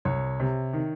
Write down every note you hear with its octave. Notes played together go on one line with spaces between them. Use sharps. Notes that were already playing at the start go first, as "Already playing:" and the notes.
C2 C#5
C3
D#3